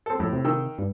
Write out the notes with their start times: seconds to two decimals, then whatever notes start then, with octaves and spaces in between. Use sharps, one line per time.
0.06 C4 A4
0.20 F2 A2
0.33 C3
0.45 D#3 G5 E6
0.79 G2